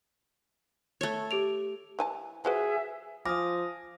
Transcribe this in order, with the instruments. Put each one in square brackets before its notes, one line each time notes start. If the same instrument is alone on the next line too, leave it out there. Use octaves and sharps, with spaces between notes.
[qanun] A3 C#5
[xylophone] G4 D7 F7
[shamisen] E3 G#5 A5
[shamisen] F3 F#4 B4 [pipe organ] G#4 [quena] E5
[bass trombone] F3 [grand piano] G#5 D6 F6 [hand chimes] D#6 A#6